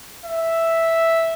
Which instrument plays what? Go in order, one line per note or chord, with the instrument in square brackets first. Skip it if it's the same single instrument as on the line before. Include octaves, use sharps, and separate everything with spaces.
[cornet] E5